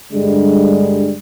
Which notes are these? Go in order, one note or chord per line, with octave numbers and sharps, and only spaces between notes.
G2 D3 G3 G#3